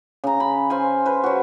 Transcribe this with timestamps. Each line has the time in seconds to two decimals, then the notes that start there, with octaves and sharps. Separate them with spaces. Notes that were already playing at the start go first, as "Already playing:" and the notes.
0.24 C#3 A#5
0.40 B5
0.70 C5 F5 G#5
1.06 B4 C5
1.24 F#3 F#4